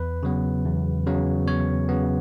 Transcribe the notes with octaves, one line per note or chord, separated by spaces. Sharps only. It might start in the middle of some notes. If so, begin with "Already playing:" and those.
Already playing: E2 B4
C#3 F#3 B3
E2
C#3 F#3 B3
E2 C#5
C#3 F#3 B3